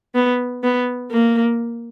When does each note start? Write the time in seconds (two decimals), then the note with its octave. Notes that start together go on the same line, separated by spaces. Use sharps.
0.15 B3
0.63 B3
1.11 A#3